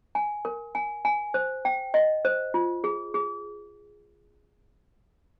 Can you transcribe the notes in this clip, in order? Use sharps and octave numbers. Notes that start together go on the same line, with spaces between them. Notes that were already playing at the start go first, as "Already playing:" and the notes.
G#5
A#4
G#5
G#5
C5
G5
D#5
C5
F4
G#4
G#4